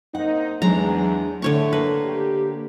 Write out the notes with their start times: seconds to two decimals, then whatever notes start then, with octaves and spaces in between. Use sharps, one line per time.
0.15 A#3 C4 D#4 F#5
0.62 E2 F#3 G#3 D4 A#5
1.42 A2 D3 A3 C#5 C#6
1.73 A#3 B4
2.05 G4